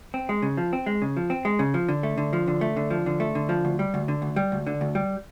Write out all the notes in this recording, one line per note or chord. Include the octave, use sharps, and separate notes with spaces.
C4
G#3
C#3
F3
C4
G#3
C#3
F3
C4
G#3
C#3
F3
D3
A3
D3
F3
D3
A3
D3
F3
D3
A3
D3
F3
D2
G3
D2
D3
D2
G3
D2
D3
D2
G3